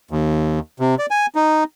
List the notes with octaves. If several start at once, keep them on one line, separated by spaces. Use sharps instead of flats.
D#2
C3
D5
G#5
D#4